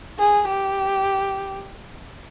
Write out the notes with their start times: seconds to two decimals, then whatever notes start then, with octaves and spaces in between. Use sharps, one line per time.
0.19 G#4
0.48 G4